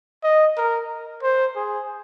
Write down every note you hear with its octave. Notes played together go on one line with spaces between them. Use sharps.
D#5
A#4
C5
G#4